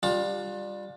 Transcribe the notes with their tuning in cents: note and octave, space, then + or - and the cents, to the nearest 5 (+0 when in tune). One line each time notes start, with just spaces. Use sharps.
G3 +15 D4 +15 F4 +30